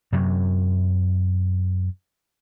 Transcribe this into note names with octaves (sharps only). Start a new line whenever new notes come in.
F#2 C3 F#3